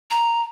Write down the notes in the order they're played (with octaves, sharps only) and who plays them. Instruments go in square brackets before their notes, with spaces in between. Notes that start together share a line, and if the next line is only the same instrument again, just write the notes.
[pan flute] A#5